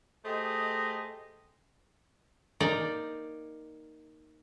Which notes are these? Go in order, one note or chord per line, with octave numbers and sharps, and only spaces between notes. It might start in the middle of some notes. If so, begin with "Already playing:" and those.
A3 G4 G#4 C5 D#5
A#3 D#4 A#4 D5 G5